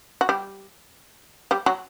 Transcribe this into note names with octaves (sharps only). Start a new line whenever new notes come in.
F#4
G3 G4
G3 G4
F#3 F#4